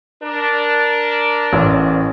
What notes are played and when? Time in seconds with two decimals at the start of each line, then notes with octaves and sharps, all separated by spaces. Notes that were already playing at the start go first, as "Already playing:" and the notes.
0.23 D4 A#4
1.53 A1